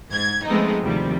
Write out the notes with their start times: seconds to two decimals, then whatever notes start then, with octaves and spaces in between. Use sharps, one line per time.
0.11 G#2 G#6
0.47 F3 G#3 A3 B3 C4 D#4
0.83 D2 C3 D#3 F3 G3